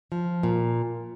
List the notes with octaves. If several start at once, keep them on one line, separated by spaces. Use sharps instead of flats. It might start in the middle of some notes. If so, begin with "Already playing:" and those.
F3
A#2